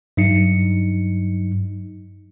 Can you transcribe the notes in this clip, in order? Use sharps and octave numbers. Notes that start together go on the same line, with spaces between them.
G2 F#3 D#4 C#7